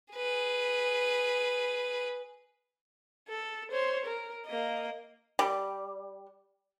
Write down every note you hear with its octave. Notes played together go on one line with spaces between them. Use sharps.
G#4 B4
A4
C5 C#5
A#4
A#3 D#5
G3